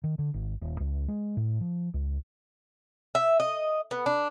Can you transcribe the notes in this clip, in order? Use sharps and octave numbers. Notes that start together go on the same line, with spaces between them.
D#3
D3
G#1
D#1
C#2
G#3
A2
F3
C#2
E5
D#5
B3
D4